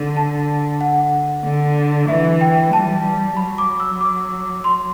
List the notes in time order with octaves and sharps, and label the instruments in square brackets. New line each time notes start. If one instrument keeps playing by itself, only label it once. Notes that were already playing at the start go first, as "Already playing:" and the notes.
Already playing: [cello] D3
[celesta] A5
F#5
[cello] D3
[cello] E3 [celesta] E5
[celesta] G5
[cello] G3 [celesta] A5
[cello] F#3 [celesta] B5
[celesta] D6
E6
D6
C6